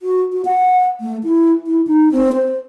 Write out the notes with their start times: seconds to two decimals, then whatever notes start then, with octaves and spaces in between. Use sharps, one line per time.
0.02 F#4
0.33 F#4
0.45 F#5
1.01 A3
1.23 E4
1.67 E4
1.87 D#4
2.12 C4
2.33 C5